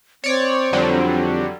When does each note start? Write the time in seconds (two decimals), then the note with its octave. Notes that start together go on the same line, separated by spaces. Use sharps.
0.24 C4 C#5 D5
0.73 F2 D3 F#3 G3